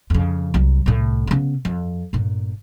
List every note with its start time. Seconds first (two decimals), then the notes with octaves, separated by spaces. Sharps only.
0.10 F2 C#3
0.54 C2 F#3
0.86 C2 A2
1.27 C#3 B3
1.65 F2
2.13 G1 A#2